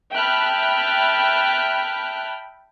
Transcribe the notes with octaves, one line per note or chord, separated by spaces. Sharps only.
E5 G5 A5 B5 F6 F#6